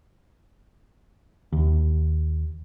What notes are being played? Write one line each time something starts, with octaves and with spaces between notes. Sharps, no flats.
D#2